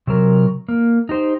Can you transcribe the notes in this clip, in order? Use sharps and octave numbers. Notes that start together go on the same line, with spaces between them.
C3 F#3 A#4
A#3
D#4 G4 C5